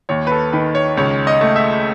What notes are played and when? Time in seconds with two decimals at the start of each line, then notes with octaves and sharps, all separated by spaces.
0.09 D#2 C#5
0.27 B4
0.32 A4
0.53 D#3 B4
0.75 C#5
0.97 C#2 C#5
1.27 D#5
1.41 A3
1.56 E5